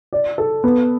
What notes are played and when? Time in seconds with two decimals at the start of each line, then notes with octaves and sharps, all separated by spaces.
0.13 D5
0.38 A4
0.64 B3